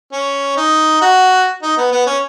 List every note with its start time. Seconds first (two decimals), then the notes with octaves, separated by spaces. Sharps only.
0.12 C#4
0.57 D#4
1.02 F#4
1.62 D#4
1.77 B3
1.92 B3
2.07 C#4